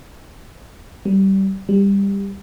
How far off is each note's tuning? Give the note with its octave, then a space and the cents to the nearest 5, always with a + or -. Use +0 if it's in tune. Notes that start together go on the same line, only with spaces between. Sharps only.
G3 -20
G3 +20